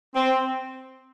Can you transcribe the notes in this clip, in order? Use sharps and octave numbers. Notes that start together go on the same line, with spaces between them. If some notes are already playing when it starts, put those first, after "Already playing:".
C4